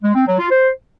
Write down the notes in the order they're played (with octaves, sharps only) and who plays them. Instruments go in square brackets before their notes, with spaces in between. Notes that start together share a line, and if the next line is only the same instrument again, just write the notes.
[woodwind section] G#3
C4
F#3
F4
C5